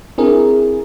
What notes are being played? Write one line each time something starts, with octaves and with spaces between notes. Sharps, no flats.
C4 D4 E4 G#4 A#4